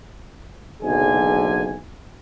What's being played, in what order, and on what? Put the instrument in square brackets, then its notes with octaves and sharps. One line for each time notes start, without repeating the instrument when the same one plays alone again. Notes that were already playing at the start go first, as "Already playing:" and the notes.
[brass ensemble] F#1 B1 D3 G#4 G#5